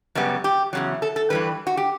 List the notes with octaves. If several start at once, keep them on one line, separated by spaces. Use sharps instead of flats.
F#2 C#3 G3 B3
G4
E2 C#3 F#3
A4
A4
G2 E3 G3 B4
F#4
G4